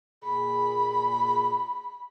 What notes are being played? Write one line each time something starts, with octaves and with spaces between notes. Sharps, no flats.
A#2 G#4 B5